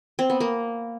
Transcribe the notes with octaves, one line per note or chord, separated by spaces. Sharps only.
C4
B3
A#3